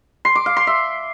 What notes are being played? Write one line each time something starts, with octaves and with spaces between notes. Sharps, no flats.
C6
D6
F5
C6
E5